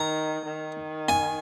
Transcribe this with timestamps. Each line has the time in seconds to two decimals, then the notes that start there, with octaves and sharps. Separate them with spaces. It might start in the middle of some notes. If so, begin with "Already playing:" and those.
Already playing: D#3 A#5
0.46 D#3
1.09 G#5